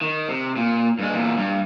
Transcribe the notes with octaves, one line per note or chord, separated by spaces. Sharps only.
D#3
C3
A#2
G2 G#3
E2 A#2
G2